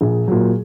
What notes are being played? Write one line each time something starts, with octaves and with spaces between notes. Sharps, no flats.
A#1 G#4
A#2 F#3